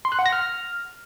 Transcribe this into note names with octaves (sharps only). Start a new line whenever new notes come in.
C6
F#6
F#5
A#6
F6